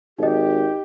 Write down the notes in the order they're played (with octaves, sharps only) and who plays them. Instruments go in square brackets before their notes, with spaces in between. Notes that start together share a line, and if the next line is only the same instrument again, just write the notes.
[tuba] G#1 [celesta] D#4 D#5 [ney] G4